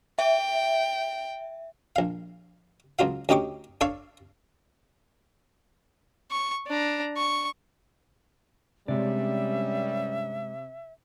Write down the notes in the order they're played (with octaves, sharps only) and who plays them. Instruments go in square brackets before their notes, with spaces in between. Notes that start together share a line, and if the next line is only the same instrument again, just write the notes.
[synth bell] E5 [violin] G5
[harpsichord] A#1 F5
C#2 F#3 F4 F5
D2 C#4 D#4 G4 C#6 D6
D4 A4 C#5 F5 A5 C#6
[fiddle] C#6
D4 A#5
C#6
[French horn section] G2 G3 C#4 [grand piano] C3 [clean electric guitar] G#3 D5 [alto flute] E5